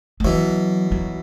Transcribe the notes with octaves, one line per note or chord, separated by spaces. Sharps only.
G#3
B2 E3 F#3
F#3